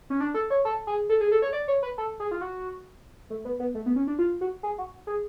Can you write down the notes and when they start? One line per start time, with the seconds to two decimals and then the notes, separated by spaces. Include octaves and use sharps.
0.10 C#4
0.20 D4
0.34 A4
0.50 C#5
0.65 A4
0.87 G#4
1.09 A4
1.21 G#4
1.32 A4
1.42 C#5
1.53 D5
1.68 C#5
1.83 B4
1.98 A4
2.20 G#4
2.31 F4
2.41 F#4
3.30 A3
3.45 B3
3.60 B3
3.75 A3
3.86 B3
3.96 C#4
4.07 D4
4.19 F4
4.41 F#4
4.63 G#4
4.78 F#4
5.07 G#4